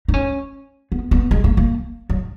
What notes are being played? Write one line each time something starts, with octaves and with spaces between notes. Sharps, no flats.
D#4
C#4
B3
B3
G#3
A#3
A#3
F#3